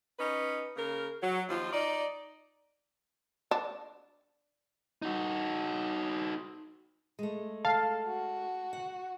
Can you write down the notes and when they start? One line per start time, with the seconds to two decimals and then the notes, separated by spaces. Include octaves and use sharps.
0.18 C#4 D#4 B4
0.77 C#3 A#3 A#4
1.23 F#3
1.49 D#2 F3 F4
1.72 D#4 D5
3.51 D4
5.02 D#4 F#4
7.19 G#3 A3
7.65 A4 F5 A5
8.07 F#4
8.73 F#5